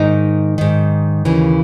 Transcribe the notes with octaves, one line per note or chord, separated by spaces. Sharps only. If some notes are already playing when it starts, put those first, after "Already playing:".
Already playing: G#2 D#3 D#4
G#2 D#3
D#2 C#3 E3